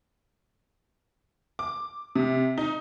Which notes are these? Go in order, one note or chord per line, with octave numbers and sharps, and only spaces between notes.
D6
C3
D#4